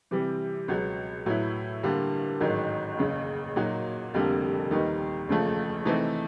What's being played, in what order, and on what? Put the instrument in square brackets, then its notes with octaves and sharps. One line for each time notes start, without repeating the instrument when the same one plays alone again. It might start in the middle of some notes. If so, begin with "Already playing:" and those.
[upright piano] C3 E3 G3
C#2 B2 F#3 B3
A2 F#3 B3 E4
G2 D3 G3 A#3
A1 G#2 D#3 F#3
F#1 E2 C#3
A#2 F#3 A#3 D#4 F#4
F1 F2 D3 G3 A#3
D#2 D#3 G3 B3 D#4
F#1 E2 C#3 F3 A3
C3 E3 A3 C4 D#4